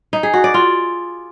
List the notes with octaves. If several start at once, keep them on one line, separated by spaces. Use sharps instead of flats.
D#4
G#4
F#4
D5
F4